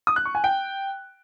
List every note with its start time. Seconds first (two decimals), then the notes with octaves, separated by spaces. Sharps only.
0.07 D#6
0.16 F#6
0.25 C#6
0.35 G#5
0.44 G5